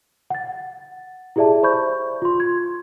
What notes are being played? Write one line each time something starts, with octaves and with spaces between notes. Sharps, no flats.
F#5 A6
E4 G4 G#4 D5 E5 A5
C5 B5 C#6 G6
F4 C6
G#6